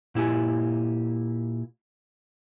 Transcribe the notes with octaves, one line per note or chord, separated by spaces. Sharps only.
A#2 E4 G4 G#5